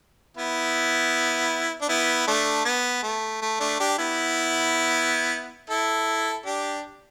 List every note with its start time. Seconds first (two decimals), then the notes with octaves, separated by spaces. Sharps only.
0.37 B3 E4
1.81 D4
1.89 B3 E4
2.27 A3 D4
2.65 B3
3.03 A3
3.42 A3
3.60 A3 D4
3.80 D4 G4
3.98 B3 E4
5.70 E4 A4
6.46 D4 G4